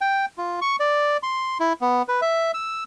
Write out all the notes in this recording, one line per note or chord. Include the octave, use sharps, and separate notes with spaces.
G5
F4
C#6
D5
C6
E4
B3
B4
E5
E6